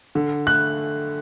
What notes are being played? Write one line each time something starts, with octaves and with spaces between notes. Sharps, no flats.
D3
A3 F#6